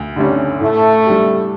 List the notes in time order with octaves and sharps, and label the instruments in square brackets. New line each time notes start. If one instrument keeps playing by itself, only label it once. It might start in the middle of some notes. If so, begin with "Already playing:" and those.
Already playing: [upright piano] D2
[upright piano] D3 A3 C#4 [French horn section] G3
[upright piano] A2 [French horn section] A3
[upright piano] G3 D4 G4